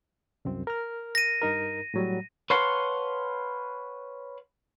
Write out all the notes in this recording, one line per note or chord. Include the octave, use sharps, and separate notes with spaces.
C2 F#2 C4
A#4 F6
A#6 D#7
G2 D#4 A#4
A2 F#3 G3
B4 C#5 F5 F#5 A5 C6